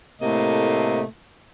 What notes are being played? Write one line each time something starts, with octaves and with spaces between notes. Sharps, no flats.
A2 C3 A3 A#3 D#5